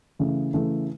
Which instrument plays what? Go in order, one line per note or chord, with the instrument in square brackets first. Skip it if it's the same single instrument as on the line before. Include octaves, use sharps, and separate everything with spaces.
[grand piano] C#3 E3 A3
C#3 E3 A3